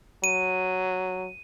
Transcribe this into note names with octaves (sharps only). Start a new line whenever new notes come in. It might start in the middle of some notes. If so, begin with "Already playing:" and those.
F#3 D#7